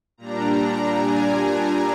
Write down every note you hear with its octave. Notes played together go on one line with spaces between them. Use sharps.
A#2 G3 D4 A#5
A#5
G#5
G#5